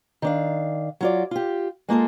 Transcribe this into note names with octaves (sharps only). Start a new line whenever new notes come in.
D#3 D4 F5
F#3 F4 D5
F4 G4
G#3 A#3 F4 A4